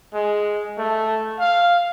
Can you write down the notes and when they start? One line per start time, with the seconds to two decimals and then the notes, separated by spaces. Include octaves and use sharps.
0.13 G#3
0.78 A3
1.39 F5